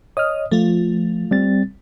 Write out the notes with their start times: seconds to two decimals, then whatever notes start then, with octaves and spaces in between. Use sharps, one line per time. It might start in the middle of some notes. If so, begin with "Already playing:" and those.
0.17 C#5 D#5 D#6 F6
0.51 F3 A3 F4
1.31 G3 C4 A6